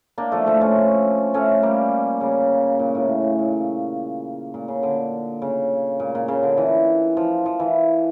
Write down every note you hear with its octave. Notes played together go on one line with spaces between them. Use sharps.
A#3 D4
F3 A3
F3 A3
A3 C#4
A3 C#4
G3 A#3
C#3
A#2
A2
A#2
A#2
C#3
D3
C#3
A#2
A#2
C#3
D3
E3
F3
F3
E3